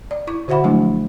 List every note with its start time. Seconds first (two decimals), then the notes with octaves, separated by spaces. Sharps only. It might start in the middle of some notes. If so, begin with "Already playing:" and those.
0.11 D5
0.27 E4 C#6
0.48 D3 F#4 C5 E5 F#5 B5
0.64 F3 F#3 G#3 A3 D4 E4